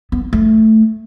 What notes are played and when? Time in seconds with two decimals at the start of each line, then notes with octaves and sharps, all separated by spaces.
0.12 B3
0.33 A3